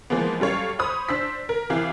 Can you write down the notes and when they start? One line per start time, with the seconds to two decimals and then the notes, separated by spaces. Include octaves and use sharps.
0.10 E3 F3 G#3 A#3 B3
0.40 F#2 G3 A4 C#5 F5
0.79 C5 C#5 B5 D#6
1.09 D4 C5 E6 B6
1.49 A#4
1.70 C3 E3 E4 F5